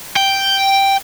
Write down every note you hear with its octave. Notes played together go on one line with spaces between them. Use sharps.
G5